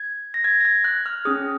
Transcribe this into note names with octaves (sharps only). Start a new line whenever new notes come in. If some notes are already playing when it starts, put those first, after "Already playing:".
Already playing: G#6
A#6
G#6
A#6
G#6
F#6
F6
C#4 G#4 D#6